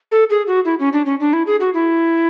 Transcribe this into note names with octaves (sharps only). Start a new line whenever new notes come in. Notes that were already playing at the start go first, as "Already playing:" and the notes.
A4
G#4
F#4
E4
C#4
D4
C#4
D4
E4
G#4
F#4
E4